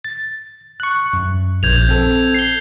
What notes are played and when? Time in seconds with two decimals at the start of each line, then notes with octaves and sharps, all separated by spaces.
0.05 A6
0.80 C#6 F#6
1.13 F#2
1.63 A#1 G6 G#6 F7
1.89 C4 A4
2.34 C7 G7